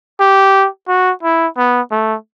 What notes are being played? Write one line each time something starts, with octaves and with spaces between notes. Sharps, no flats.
G4
F#4
E4
B3
A3